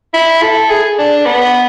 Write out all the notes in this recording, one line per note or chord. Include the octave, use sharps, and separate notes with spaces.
E4
A4
G#4
D4
B3